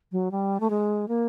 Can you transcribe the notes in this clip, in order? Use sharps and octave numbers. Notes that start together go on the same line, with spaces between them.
F#3
G3
A3
G#3
A#3